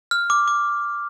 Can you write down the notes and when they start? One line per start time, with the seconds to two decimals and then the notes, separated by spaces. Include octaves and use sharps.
0.11 F6
0.30 D6
0.48 D6